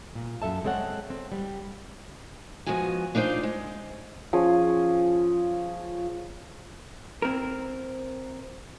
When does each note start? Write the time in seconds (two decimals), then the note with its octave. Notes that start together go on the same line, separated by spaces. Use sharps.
0.15 A#2
0.42 F#2 A4 E5 A5
0.64 G#3 C4 A4 C#5 F#5
1.10 C4
1.32 G3
2.66 F3 G#3 B3 F#4 G#5
3.15 D4 D#4 F4 C5 D5
3.43 G#3
4.33 F3 C#4 G#4 D#6
7.22 C4 A#4